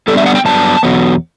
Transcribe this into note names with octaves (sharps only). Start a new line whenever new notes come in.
D3 G3 B3 D4 A4
E5
F#5
G5
G2 F#3 B3 D4 A5
E2 B2 F#3 B3